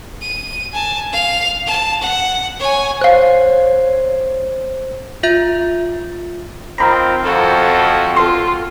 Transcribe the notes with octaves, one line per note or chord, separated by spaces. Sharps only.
D#7
G#5 A5
F5 F7
A5
F#5
C#5 G#5
C5 C#5 F5 F#6 C7
F4 E5 G6
D#3 C4 F4 A#5 B5
F2 F#4 A4
F4 A4 C6